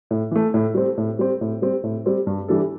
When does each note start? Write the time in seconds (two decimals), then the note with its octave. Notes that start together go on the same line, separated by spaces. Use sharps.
0.11 A2
0.31 E3 A3
0.54 A2
0.75 G3 C4
0.98 A2
1.19 G3 C4
1.41 A2
1.62 G3 C4
1.83 A2
2.06 G3 C4
2.27 G2
2.48 E3 G3 D4 A4